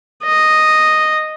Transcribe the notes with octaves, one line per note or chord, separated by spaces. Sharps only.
D#5